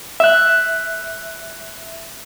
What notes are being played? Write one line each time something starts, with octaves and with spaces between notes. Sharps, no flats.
E5 F#6